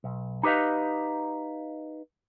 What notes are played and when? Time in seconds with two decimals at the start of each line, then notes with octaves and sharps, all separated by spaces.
0.04 B1
0.43 D#4 G4 B4 D#5 F5